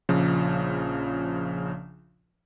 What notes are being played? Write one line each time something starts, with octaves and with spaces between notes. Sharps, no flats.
A#1 C#3 F3